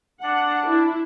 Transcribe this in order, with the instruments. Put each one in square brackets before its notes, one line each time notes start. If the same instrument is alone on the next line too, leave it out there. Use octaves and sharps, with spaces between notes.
[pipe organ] D4 [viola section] F#5
[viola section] E4